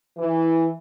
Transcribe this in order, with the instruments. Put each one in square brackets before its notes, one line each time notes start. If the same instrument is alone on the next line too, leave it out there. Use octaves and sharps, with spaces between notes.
[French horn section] E3